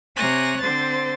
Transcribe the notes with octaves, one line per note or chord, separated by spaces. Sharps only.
C3 C#5 G#5 F#6 A#6
D3 C4 C5 A6